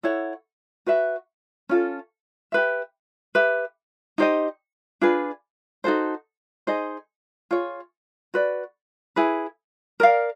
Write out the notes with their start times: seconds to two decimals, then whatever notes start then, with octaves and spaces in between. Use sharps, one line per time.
0.03 E4 A4 C#5 F#5
0.86 F#4 B4 E5
1.69 C#4 F4 A4
2.52 G4 B4 E5
3.35 G4 B4 E5
4.18 D#4 G4 C5 D#5
5.01 D4 F4 G#4 B4
5.84 D#4 F#4 A4 C5
6.67 D#4 G#4 C5 D#5
7.51 F4 G#4 C#5
8.34 F#4 B4 D5
9.16 E4 G#4 B4
10.00 A#4 D5 F5